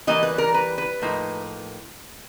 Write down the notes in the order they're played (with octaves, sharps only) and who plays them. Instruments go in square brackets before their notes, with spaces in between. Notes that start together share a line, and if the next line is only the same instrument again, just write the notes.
[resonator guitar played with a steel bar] E3 G3 A#3 D#5
B4
A#4
B4
B4
A2 F3 A#3 D#4